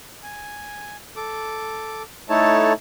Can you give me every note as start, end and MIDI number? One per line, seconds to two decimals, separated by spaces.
0.23 0.97 80
1.16 2.03 69
1.16 2.03 86
2.29 2.73 57
2.29 2.73 63
2.29 2.73 64
2.29 2.73 69
2.29 2.73 73
2.29 2.73 81